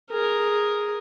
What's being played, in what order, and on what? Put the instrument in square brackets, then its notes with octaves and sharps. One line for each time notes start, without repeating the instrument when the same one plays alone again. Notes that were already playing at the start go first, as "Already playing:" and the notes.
[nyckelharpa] G#4 A#4